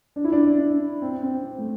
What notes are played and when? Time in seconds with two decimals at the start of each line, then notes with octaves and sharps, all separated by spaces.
0.16 D4
0.24 E4
0.32 D4
0.59 D4
1.02 C4
1.23 C4
1.44 C4
1.58 A3